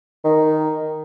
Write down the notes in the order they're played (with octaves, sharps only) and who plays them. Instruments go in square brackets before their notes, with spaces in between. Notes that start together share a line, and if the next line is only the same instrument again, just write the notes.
[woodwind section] D#3